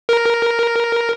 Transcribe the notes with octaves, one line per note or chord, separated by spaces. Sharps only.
A#4